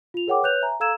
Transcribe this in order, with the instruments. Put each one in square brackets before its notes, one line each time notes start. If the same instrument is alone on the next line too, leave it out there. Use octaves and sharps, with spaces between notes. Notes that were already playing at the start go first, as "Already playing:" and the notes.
[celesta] F4 F7
G#4 A#4 C#5 F#5 G5 D6
B4 C#5 F#6 G6 F7
E5 G#5 A#5
A4 F5 A#5 E6 G#6 E7